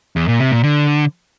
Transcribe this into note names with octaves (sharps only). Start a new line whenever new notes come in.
E2
A#2
C3
A#2
D3